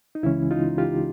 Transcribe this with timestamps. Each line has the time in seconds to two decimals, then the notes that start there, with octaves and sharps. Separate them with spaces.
0.15 D#4
0.23 C#2 C#3 E3 G#3 C#4 E4
0.51 D#4 F4
0.78 F4 G4